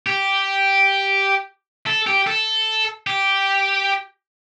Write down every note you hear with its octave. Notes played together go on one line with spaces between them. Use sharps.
G4
A4
G4
A4
G4